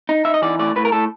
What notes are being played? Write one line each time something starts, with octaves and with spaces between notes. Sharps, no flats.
D#4
D#4 E5
D#5
E3 D5
A2 D5
A2 B4
A#4
A2 A4